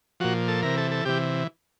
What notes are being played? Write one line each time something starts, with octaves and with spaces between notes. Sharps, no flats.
A#2 F3 F#4
A4
C3 E3 A#4
A4
A4
C3 E3 G4